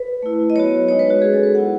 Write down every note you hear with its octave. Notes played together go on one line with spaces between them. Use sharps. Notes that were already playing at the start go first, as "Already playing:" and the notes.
Already playing: B4
A3 E4
D#5
F#3 B3 F#4 C#5
G#3 D#4 F#4 C#5
B4
F#4
G#3 C#4 F#4 G#4
A4
B4
F#3 B3 E4 F#5